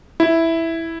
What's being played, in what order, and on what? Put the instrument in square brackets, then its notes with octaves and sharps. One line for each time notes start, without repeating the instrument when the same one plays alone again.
[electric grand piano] E4